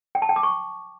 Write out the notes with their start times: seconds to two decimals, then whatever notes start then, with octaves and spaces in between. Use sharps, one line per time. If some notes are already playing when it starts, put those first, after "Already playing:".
0.15 G5
0.22 A5
0.29 G5
0.36 D6
0.43 C#6